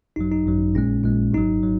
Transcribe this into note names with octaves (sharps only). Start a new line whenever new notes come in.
G#1 F#2 F#3 D#4
D#4
G#1 F#2 F#3
A#1 A#2 G#3 C#4
A#1 A#2 G#3
G#1 G#2 F#3 D#4
F#3